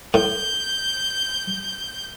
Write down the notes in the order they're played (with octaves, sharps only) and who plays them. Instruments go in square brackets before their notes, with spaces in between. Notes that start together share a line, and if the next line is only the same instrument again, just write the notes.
[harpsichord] A2 [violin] G6